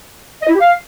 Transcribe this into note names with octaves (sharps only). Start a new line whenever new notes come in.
D#5
E4
G4
F5